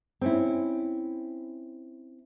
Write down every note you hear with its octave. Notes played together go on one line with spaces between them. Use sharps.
C4 C#4 E4